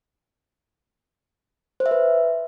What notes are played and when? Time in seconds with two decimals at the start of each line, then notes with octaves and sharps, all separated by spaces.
1.80 C5
1.86 E5
1.91 B4